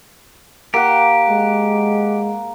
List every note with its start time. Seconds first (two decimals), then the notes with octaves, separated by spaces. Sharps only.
0.74 A#3 G4 F#5
1.30 G#3